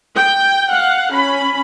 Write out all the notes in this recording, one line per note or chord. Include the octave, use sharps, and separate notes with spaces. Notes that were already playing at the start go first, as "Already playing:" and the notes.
G5
F5 F#5
C#4 B5